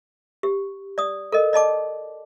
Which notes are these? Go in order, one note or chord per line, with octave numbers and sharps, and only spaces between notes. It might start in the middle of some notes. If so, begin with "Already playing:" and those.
G4
D5 D#6
A4 A#4 D#5
D5 D#5 A5 D6